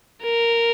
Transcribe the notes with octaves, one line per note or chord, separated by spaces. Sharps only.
A#4